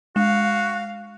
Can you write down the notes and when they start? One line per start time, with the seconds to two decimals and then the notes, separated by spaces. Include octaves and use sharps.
0.16 G#3 F#4 F5